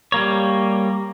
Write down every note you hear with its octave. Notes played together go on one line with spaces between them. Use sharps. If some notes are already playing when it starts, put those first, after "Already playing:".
G3 A#3 C#5